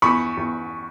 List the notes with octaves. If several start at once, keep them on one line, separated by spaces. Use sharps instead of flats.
E2 B5 C#6
E2